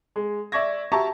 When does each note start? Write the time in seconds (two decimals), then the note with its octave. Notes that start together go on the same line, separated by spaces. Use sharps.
0.16 G#3
0.52 D5 E5 C#6 G#6 A#6
0.92 F#4 G4 E5 A5 A#5 C#6